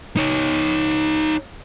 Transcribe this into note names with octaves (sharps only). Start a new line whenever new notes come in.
D#4 C#5